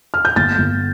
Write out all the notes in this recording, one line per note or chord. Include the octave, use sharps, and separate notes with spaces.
F6
G6
G1 A6
G1